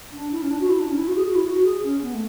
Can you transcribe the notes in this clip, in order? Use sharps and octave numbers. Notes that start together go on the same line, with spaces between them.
D4
E4
C#4
D4
F#4
E4
D4
C#4
E4
F#4
G#4
F#4
E4
F#4
G#4
C#4
B3
A3